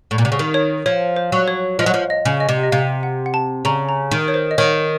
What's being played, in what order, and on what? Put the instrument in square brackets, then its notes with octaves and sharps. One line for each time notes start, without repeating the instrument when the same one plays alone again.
[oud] A2
A#2
C3
C#3
D#3
[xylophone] C#5
[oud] F3 [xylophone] C#5
[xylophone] C5
[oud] F#3
[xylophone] C#5
[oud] F3 [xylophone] D#5
[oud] F#3
F3
[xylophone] D#5
[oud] C#3
[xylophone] D#5
[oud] C3
[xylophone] D#5
[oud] C3 [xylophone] F5
[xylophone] F#5
F#5
A5
[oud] C#3 [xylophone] A#5
[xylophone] A#5
[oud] D#3
[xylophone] C#5
C5
D#5
[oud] D#3 [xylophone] C#5